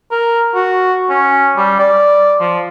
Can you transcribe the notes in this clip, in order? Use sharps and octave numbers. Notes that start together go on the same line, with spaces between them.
A#4
F#4
C#4
G3
D5
F3